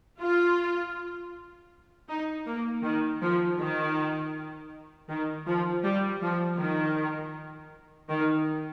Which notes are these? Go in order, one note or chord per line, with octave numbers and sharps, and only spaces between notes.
F4
D#4
A#3
D#3
F3
D#3
D#3
F3
G3
F3
D#3
D#3